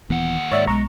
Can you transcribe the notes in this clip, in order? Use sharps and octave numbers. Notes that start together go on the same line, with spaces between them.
D#1 D#2 E3 B3 F#5
G#2 C#5 D5 E5
B1 B2 G#3 A#5 C#6